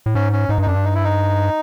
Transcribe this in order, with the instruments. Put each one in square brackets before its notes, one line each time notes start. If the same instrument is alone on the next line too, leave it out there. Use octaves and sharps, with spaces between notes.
[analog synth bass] A2
[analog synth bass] G#2 [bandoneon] C#4
[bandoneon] C#4
[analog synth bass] G#2 [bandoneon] D#4
[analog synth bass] G2
[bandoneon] D#4
[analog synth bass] F#2 [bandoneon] D4
[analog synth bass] G2
[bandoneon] D#4
E4
D#4